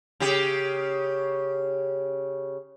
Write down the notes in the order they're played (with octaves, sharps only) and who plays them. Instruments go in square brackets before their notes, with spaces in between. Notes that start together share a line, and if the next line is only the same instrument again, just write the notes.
[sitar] C#3 G4